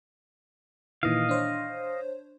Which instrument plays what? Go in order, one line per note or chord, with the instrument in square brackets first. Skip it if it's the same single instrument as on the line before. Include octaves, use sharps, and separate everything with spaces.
[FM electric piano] A#2 D#3 E3 [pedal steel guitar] D#5 F5
[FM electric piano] D4 C5 C#5